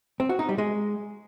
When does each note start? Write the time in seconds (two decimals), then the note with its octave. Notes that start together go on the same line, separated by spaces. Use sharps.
0.20 C4
0.29 F#4
0.39 D#4
0.49 G3
0.58 G#3